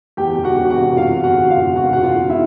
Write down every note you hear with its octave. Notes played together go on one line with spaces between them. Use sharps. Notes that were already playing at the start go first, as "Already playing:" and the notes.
E2 G4 G5
E1
F#4 F#5
E1
F#4 F#5
C3
E1 F4 F5
E1
F#4 F#5
E1
F4 F5
E1
C3 F#4 F#5
E1 F#5
F4 F5
E1
E4 E5